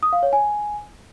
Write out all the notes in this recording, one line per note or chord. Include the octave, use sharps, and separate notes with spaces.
D#6
F5
C#5
G#5